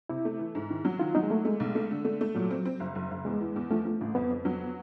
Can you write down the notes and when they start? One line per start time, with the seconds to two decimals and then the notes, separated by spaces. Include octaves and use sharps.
0.09 C3 E4
0.25 A3
0.39 E3
0.55 G#2
0.70 D#3
0.85 F#3
1.00 D#3 F4
1.15 F#3 D#4
1.23 G#3
1.30 A3 A#3
1.45 G#3 A3
1.60 B1
1.75 A3
1.91 D3
2.05 A3
2.21 A3
2.35 A#2 F#3
2.51 C4
2.65 C4
2.80 F#1
2.95 F#1
3.11 F#1
3.25 E2 G#3
3.41 E3
3.56 E2
3.71 F3 A3
3.85 F3
4.01 A1
4.15 F2 B3
4.31 F2
4.45 F#3